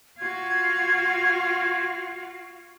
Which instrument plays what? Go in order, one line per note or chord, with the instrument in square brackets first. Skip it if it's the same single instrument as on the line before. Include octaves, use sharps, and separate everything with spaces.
[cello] F4 F#4 [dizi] G#6